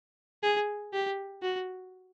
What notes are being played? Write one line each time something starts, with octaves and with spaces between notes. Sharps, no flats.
G#4
G4
F#4